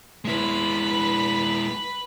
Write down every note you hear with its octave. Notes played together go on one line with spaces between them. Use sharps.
G#3 E4 B4 B5